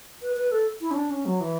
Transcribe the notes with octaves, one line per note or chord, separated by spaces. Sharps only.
B4
B4
A4
E4
C#4
D4
C#4
F#3
E3